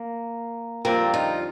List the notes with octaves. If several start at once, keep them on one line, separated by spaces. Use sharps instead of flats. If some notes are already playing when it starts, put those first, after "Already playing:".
Already playing: A#3
F2 D3 G3 A#3 C4
D#4 F4